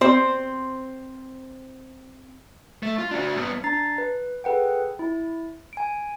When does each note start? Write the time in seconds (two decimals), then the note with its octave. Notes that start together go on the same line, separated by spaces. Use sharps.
0.01 C4 C5
2.83 A3
2.98 F4
3.11 D4 F#4
3.36 G2 B3
3.64 D4 A#5 A6 C7
3.98 B4
4.44 G#4 A4 B4 F#5 G5
4.99 E4
5.73 G#5 D7